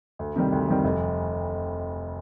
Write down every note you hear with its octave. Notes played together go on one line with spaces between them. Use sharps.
D2
C3 D#3 G3
D2
C3 D#3 G3
F1